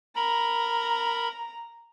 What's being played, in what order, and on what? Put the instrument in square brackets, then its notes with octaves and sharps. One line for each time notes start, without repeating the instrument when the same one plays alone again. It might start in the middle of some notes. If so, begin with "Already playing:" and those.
[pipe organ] A#4 B5 [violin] A#5